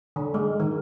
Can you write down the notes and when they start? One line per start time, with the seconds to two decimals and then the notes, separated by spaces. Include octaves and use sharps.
0.16 D3
0.34 G#3
0.60 D#3